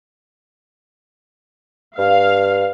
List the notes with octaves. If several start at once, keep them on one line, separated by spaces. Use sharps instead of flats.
G2 F5